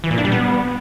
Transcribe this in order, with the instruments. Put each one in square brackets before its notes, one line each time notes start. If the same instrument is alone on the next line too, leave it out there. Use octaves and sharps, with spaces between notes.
[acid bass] E3
A#2
D4
G3
B3